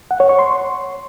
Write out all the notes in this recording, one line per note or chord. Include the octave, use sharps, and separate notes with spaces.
F#5
C#5
C#6
C6